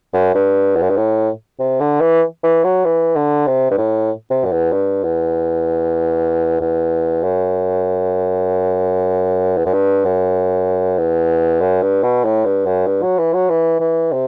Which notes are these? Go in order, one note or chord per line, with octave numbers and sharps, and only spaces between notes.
F#2
G2
E2
F#2
G2
A2
C3
D3
E3
E3
F#3
E3
D3
C3
G2
A2
C3
F#2
E2
G2
E2
E2
F#2
E2
F#2
G2
F#2
E2
F#2
G2
B2
A2
G2
F#2
G2
F#3
E3
F#3
E3
E3
C3